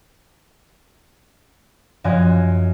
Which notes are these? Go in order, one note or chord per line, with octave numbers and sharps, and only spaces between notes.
F#2 F3 D#5 G#5 F#6 G#6